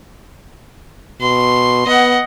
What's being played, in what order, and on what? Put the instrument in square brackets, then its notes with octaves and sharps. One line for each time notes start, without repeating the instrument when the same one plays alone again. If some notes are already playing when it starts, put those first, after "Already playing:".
[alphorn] B2 [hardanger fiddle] C6
[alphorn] B3 [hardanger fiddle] D#5 F#5